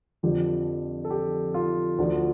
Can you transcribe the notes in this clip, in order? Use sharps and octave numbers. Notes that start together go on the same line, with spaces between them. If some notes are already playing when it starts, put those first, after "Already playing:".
F2 D3 F3 G4
A4
G4
F4
D2 D3 F3